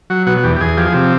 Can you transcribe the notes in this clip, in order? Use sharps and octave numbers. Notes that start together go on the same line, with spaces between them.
F#3 F#4
B2 F#4
F#4
E2 G4
G4
E2 G#4
F3 G4
G#4
C3 G4